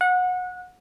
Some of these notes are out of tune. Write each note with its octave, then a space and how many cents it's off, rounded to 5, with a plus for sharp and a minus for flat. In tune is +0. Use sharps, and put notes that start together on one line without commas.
F#5 -25